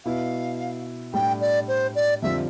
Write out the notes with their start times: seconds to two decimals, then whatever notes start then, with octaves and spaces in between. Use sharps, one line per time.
0.05 B2 B3 E4 F5
1.13 A2 G3 D4 G5
1.41 D5
1.68 C5
1.95 D5
2.22 F2 D3 G3 C4 F4 E5